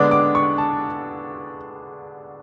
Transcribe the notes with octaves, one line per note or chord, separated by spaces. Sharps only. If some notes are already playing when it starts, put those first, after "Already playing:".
Already playing: D3 G#3 B3 D4 D6
D6
C#6
A5